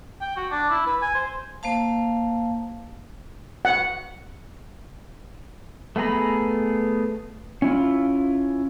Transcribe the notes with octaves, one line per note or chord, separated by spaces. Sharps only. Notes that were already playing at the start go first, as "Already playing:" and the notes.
G5
F#4
D4
E4
B4
G#5
C5
A#3 C5 F5 A5
F#5
A3 B3 G#4 A#5 B5
C#4 E4 F4